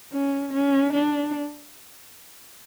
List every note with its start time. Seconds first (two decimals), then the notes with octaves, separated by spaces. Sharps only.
0.13 C#4
0.53 C#4
0.93 D4